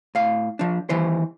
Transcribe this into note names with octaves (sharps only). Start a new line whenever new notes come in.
A2 F5
F3 D4
D#2 E3 C5